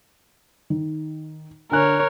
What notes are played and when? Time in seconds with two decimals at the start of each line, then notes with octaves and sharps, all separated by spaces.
0.70 D#3
1.72 D3 A#4 C#5 G#5 F#6